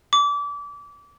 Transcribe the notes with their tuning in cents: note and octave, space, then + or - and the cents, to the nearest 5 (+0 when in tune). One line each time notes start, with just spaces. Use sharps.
D6 -30